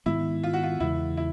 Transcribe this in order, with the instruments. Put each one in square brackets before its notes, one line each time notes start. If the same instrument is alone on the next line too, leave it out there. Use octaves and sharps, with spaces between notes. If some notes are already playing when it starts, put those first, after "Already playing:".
[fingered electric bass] G#2 D#3 G#3 B3 [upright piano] E4
[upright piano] F4
F#4
F4
[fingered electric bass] E2 C#3 E3 G#3 [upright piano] E4
[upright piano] E4